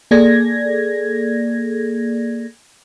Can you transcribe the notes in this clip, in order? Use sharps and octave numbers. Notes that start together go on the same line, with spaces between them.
A#3 G#4 A4 D5 G#6 A#6